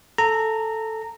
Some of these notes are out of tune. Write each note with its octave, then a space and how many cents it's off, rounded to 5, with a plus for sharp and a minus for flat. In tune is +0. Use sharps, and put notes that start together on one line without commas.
A4 +0 A#5 -15